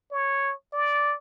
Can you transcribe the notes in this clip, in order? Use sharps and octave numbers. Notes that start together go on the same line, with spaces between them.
C#5
D5